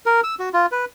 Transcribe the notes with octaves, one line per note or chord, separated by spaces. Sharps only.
A#4
E6
F#4
F4
B4